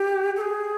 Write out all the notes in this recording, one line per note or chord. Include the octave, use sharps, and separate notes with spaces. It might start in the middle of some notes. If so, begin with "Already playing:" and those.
Already playing: G4
A4
G#4